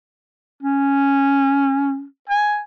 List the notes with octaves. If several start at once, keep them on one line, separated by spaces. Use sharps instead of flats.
C#4
G#5